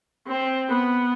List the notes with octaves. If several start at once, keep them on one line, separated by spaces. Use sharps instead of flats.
C4
B3